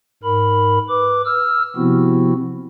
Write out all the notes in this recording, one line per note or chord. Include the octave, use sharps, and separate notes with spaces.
G#2 A#4 B5
B4 D6
E6 F6
C3 F3 B3 C4 E4 F#4